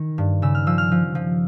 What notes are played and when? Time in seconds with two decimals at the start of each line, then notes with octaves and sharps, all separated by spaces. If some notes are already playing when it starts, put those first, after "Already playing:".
Already playing: D#3
0.18 G2
0.42 C#3 E6
0.55 F6
0.67 F3 E6
0.78 F6
0.91 F3
1.15 F3